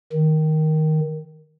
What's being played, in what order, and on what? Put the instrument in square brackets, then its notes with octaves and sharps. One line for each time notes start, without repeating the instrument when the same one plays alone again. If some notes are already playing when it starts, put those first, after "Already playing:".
[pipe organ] D#3